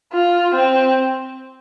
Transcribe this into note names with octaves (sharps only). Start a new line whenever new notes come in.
F4
C4